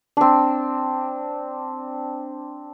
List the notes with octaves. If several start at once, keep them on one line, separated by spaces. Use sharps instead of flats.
C4 D4